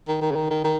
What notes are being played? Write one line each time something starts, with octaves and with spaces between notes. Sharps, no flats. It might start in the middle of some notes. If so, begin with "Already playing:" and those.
D#3
D#3
C#3
D#3
D#3
D#3